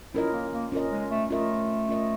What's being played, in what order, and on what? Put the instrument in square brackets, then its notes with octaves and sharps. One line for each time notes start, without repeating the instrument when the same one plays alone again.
[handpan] C#4 F4 A#4 D#5 [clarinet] E4
[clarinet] A#3
A#3
[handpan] C#4 F4 A#4 D#5
[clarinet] G#3
A3
[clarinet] A3 [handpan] C#4 F4 A#4 D#5
[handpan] C#4 F4 A#4 D#5